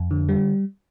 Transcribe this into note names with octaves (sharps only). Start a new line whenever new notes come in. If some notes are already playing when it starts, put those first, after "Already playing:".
Already playing: F2
D3
G3